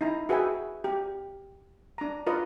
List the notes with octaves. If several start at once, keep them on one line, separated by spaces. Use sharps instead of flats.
D#4 E4 A#5
F#4 G#4 B4 E5 G5 G#5
G4
D4 A#5
F4 A#4 B4 D#5